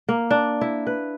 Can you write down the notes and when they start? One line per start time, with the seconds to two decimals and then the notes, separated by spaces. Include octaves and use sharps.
0.09 A#3
0.31 D4
0.61 E4
0.87 B4